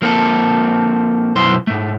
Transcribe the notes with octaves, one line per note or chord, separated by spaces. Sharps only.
F3 A#3 C4 A4
B1 F#2 B3 E4 C5 C6
G#2 A3